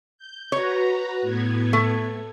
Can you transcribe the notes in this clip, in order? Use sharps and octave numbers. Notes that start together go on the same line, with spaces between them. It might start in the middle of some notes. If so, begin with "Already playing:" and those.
G6
F#4 B4 C#5 A#5
A2 B3 G#6
A3